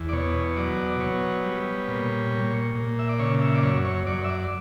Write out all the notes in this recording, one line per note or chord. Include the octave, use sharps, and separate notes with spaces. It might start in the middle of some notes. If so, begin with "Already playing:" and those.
Already playing: E2
D5
B2 C#5
F#3 D5
B2 C#5
G3
A#2
A#2
A#2
E5
D5
C#3 C#5
E5
D5
F#2 C#5
C#5
F#2 D5
E5
D5